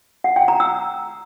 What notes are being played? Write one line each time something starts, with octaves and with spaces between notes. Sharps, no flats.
F#5
G5
A#5
E6